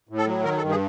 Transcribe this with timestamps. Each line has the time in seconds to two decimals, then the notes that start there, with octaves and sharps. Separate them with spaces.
0.09 A2
0.18 A4
0.27 F#3
0.44 D#3 A#4
0.57 A4
0.62 G2
0.70 G#4